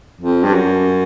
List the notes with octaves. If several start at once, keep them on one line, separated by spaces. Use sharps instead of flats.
F2
G2
F#2